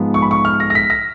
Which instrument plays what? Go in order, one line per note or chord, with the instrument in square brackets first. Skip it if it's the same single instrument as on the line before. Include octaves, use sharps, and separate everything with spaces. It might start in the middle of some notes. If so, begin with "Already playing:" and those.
Already playing: [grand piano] G#2 F3 G#3 B3
C#6
B5
C#6
F6
A#6
A#6
B6
A#6